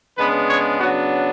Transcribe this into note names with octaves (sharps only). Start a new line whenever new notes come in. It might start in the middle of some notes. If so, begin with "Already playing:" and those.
C#3 G#3 B3 D4 B4
C#5
C#3 F#3 B3 D4 F#4